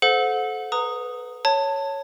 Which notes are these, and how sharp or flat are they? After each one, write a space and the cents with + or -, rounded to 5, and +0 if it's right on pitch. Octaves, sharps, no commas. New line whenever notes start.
A4 -30 C5 -20 F#5 -30
B4 +0 A#5 -15 D#6 +0
C#5 +0 A5 +20